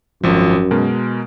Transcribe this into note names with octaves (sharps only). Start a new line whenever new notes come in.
G#1 F#2 F3
B2 G#3 A#4